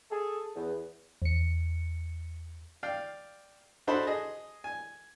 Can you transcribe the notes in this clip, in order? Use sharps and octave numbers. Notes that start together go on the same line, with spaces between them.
G#4 A4
E2
E2 C#7
D5 F5 G5
D4 D#4 F#4 A4 C5 B5
G#4 D#5
G#5